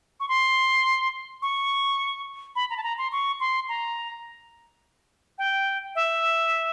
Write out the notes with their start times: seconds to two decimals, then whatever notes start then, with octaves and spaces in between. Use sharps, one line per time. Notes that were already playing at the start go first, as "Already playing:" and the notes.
0.20 C#6
0.29 C6
1.42 C#6
2.56 B5
2.70 A#5
2.77 A5
2.83 A#5
2.98 C6
3.12 C#6
3.40 C6
3.69 A#5
5.38 G5
5.95 E5